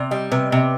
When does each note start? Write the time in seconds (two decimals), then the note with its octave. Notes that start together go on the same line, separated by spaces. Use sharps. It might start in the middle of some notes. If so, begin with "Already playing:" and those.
Already playing: C3 D5
0.11 G3 D#5
0.31 C3 B4
0.52 C3